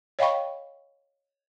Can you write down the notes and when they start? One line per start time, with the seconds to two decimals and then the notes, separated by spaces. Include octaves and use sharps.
0.19 C#5 D#5 F5 G5 B5 C#6